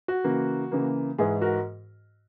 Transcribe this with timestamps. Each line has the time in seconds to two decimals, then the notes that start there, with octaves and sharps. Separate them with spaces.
0.08 F#4
0.24 C#3 E3 A#3
0.71 C#3 E3 A#3
1.18 G#2 E3 G#3 E4 G#4
1.41 F#4 A#4